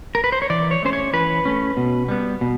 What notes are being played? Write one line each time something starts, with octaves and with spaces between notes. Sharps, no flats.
A#4
B4
C5
C#5
E3 D5
C#5
A3 C#4 C5
C#5
E3 B4
A3 C#4
B2
G3 B3
B2